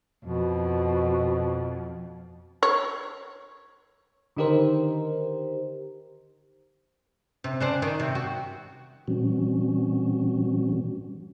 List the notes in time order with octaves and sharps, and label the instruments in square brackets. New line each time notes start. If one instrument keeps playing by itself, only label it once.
[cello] F2 [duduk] B2
[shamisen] C#5
[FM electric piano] D3 D#3 D#4 G4 A#4 C5
[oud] C3
C#3 D4 C5
D#3
C3
F#4
[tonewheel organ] A#2 E3 G3 C4 C#4 F#4